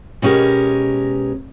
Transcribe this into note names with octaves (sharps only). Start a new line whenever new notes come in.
B2 G#3 C#4 G4 A#4